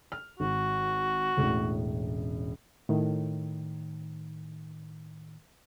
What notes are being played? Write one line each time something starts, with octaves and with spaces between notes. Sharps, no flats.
F6
G#1 F#4
E1 A1 A2
A2 D#3